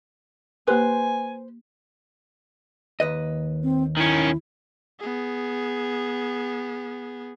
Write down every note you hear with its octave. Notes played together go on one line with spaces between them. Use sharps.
A#3 G4 B4 C5 G#5
D#2 B4 D#5
C4
D#3 C#4 E4
B3 G#4